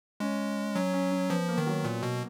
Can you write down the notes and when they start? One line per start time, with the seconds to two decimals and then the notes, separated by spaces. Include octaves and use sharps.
0.20 G#3 C#4
0.75 F#3 C#4
0.93 C#4
1.11 C#4
1.29 F3 B3
1.48 A#3
1.58 D#3
1.66 F#3
1.84 A#2
2.03 B2